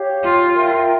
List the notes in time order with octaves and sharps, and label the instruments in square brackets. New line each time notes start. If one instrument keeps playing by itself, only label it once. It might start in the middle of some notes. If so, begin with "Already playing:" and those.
Already playing: [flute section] G4 C#5 F5
[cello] F4
[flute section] A#4 E5 G5